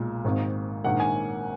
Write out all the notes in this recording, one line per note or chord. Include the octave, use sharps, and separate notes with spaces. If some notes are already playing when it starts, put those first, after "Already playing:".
Already playing: B1 A#2 G#3
G#1 G#2 D#3 A#3
A#1 G#2 D#3 A#3 F#5
G#5